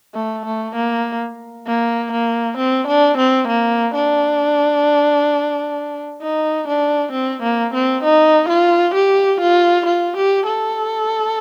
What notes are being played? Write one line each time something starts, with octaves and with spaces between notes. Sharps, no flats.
A3
A3
A#3
A#3
A#3
C4
D4
C4
A#3
D4
D#4
D4
C4
A#3
C4
D#4
F4
G4
F4
F4
G4
A4